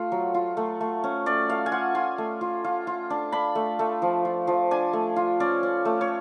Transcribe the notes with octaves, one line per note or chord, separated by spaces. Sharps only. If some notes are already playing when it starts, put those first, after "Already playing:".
Already playing: A3 F4
F#3
F4
A3
A3
C#4
C#4 D5
A3 F5
G#5
F4 F#5
F4 G#5
A3
F4
F4
F4
D4
D4 B5
A3
A3
F3
F4
F3
D4 G#5
A3
F4
C#4 D5
C#4
A3
C#5